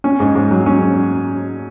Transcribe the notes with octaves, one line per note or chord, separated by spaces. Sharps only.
C#4
G#2
G#2
F#3
C#4